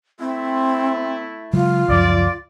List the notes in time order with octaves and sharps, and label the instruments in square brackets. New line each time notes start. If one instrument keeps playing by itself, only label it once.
[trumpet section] A3 E4 [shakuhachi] C4
[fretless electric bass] C#3 F#3 G#3 [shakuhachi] F4
[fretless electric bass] C#2 F#2 F3 [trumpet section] D5